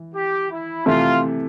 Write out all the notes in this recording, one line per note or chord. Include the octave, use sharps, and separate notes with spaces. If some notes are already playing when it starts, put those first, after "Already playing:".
Already playing: E3
G4
E4
C3 E3 A3 E4 F4